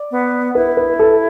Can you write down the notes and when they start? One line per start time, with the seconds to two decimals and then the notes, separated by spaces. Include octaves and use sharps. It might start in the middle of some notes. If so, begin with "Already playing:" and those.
Already playing: D5
0.11 B3
0.55 E4 B4
0.77 B4
0.99 A4